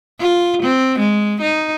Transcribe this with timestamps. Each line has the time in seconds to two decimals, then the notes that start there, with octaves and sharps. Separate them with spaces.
0.20 F4
0.62 C4
0.99 G#3
1.41 D#4